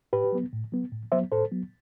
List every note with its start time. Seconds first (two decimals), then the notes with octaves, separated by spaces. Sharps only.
0.13 A2 G4 B4
0.32 F#3 B3
0.53 A2
0.72 F#3 B3
0.92 A2
1.12 F#3 B3 C5 E5
1.32 A2 A4 C5
1.52 F#3 B3